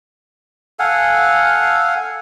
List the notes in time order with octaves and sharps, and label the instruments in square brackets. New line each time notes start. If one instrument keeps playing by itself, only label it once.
[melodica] A4 F5 F#5 G#5